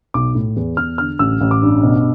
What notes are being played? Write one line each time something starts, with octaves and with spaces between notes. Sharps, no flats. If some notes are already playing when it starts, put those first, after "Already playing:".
B1 D6
A2
E2
E2 F6
D3 F6
A1 E6
A1
D6
G2
B2